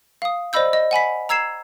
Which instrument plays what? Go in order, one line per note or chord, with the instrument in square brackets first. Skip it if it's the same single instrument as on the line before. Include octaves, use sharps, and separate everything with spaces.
[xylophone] F5 D#6
C5 D5 D#5 B5 E6 G6
D#5
F#5 G#5 B5 B6
A#5 E6 G#6 C7 E7